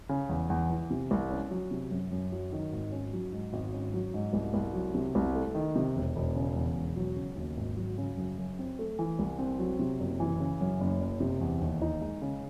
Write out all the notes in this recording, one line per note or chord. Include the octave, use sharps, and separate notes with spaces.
C#3
E2
E2
E3
C3
C2
C#4
F#3
C3
F#2
F#2
F#3
D#3
G#1
C#4
F#3
G#2
G#1
C#4
F#3
G#2
C2
C2
F#3
C3
C2
A3
D#3
C3
E1
E1
C#3
E2
E1
F#3
C#3
D#2
G#1
F#3
C#3
F#2
F#2
C4
A3
E3
C2
C4
F#3
C3
F#1
E3
C#3
F#2
F#1
F#1
C3
E2
D#2
D#4
G#3
C#3